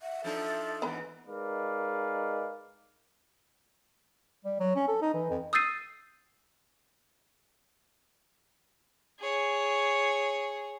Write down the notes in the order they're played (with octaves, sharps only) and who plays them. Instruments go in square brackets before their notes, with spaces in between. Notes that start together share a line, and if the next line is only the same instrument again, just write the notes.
[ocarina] E5 [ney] F#5
[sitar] F3 D4 D#4 [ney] A4
[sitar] G#2 E3 [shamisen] B3 A#5
[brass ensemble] G#3 D#4 A#4 B4 D5 F5
[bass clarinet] G3
F#3
C#4
A4
D#4
E3
F2
[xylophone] D#6 E6 G6 A6 C7 D#7
[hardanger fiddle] G#4 C#5